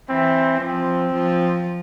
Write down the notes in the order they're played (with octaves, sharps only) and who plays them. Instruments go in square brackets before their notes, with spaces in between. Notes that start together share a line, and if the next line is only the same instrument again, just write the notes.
[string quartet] E3 [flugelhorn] C4
[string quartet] F3 [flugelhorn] C4
[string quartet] F3